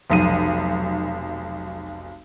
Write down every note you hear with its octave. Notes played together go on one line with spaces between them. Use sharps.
F1 B1 D#7